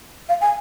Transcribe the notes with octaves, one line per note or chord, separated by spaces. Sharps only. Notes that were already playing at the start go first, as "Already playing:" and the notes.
F5
G#5